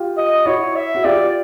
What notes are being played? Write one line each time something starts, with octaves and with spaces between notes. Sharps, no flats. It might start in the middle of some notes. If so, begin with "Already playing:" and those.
Already playing: F4 G4
D#5
E4 F#4 C#5
E5
F#4
F4 G4 D5